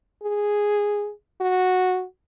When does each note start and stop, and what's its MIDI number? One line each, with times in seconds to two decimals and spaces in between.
0.23 1.11 68
1.41 2.04 66